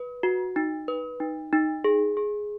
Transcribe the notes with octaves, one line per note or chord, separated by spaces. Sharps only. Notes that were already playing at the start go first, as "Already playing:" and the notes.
Already playing: B4
F#4
D#4
B4
D#4
D#4
G#4
G#4